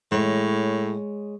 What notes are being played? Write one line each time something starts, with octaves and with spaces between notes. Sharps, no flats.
A2 G#3 C#5